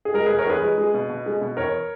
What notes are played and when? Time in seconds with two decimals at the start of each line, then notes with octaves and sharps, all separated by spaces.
0.05 G#4
0.14 G#3 A#4
0.26 E1 G#4 B4
0.39 A#4 C#5
0.47 E2 G#4 B4
0.63 G#3
0.78 G#3
0.94 B2
1.10 B2
1.26 G#3
1.41 B2
1.57 E2 A#4 C#5